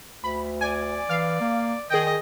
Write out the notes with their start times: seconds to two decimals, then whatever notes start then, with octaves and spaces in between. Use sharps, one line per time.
0.24 D2 B5
0.61 D5 G#5
1.09 E3 F5
1.41 A#3
1.90 D#3 G#4 D#5 G5